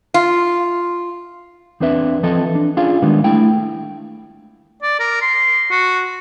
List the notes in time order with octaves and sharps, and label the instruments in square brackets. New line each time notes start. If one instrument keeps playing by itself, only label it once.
[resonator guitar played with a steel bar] F4
[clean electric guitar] E2 C4 D4 B4 E5
E3 F3 C4 A4 B4 D#5
D4
C#4 D4 F4 G#4 D5 F5
D#3 G3 G#3 B3 D4
A3 D4 E4 G5
[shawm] D5
A#4
C6
F#4